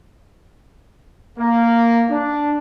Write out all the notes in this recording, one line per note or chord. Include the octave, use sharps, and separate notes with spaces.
A#3
D4